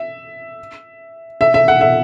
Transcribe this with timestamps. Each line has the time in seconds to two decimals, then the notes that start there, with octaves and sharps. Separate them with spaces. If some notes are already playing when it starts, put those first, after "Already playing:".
Already playing: E5
1.41 E5
1.54 E5
1.68 F#5
1.81 E5